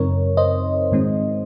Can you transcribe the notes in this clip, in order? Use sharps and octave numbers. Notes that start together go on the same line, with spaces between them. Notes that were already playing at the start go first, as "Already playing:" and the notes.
Already playing: F#2 C#3 F#3 C4 D#4 A#4 C#5
C5 D#5
G#2 D#3 G#3 C4 D#4